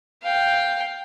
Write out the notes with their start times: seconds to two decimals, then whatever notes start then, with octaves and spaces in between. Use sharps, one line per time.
0.23 F5 G5